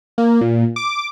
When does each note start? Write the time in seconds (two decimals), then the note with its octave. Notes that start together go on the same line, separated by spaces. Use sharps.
0.18 A#3
0.41 A#2
0.76 D6